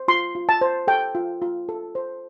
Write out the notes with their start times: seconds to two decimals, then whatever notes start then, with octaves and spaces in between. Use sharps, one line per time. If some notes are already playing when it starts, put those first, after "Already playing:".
Already playing: C5
0.08 F4 C6
0.35 F4
0.49 A5
0.61 C5
0.87 A4 G5
1.15 F4
1.42 F4
1.69 A4
1.95 C5